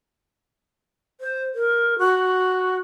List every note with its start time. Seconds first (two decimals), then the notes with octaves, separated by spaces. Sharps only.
1.21 C5
1.55 A#4
1.99 F#4